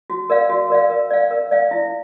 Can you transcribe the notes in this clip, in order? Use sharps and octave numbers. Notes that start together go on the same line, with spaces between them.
F#4
A#4 D5 F5
F#4
A#4 D5 F5
A#4
D5 F5
A#4
D5 F5
E4